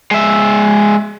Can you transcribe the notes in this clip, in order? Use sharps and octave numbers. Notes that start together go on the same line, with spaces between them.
G#3 E5